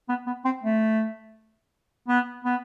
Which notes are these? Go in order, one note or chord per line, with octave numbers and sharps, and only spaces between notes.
B3
B3
C4
A3
B3
B3